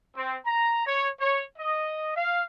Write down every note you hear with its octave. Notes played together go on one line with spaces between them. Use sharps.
C4
A#5
C#5
C#5
D#5
F5